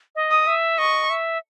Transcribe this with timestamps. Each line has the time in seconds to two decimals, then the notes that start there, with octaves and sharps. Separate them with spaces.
0.15 D#5
0.31 D#6
0.47 E5
0.78 D#5 C#6
1.10 E5